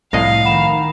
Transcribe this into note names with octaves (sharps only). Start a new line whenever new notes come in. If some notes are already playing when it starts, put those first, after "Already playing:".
C2 A2 F3 D#5 F5 A#6 C7
D#3 F#5 B5 E7